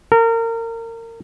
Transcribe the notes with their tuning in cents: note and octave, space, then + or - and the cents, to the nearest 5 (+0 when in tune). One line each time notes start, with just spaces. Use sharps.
A#4 -30